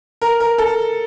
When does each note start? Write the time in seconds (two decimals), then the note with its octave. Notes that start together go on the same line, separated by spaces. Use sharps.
0.21 A#4
0.40 A#4
0.58 A4